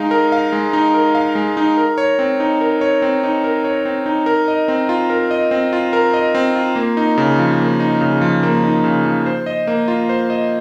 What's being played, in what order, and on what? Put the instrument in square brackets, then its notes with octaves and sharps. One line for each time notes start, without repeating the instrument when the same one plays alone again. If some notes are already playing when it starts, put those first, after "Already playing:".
Already playing: [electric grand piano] G#3 D#4 F5
A#4
F5
G#3
D#4
A#4
F5
G#3
D#4
A#4
C#5
C4
D#4
A#4
C#5
C4
D#4
A#4
C#5
C4
D#4
A#4
D#5
C4
F4
A#4
D#5
C4
F4
A#4
D#5
C4
F4
A#3
D#4
C#3
F3
A#3
D#4
C#3
F3
A#3
D#4
C#3
F3
C5
D#5
A#3
F4
C5
D#5